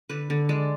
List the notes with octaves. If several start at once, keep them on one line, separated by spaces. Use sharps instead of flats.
D3 B4
D3
G#3 D5